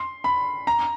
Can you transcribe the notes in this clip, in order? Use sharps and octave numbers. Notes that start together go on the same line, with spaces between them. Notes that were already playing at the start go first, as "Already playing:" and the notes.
Already playing: C6
B5
A#5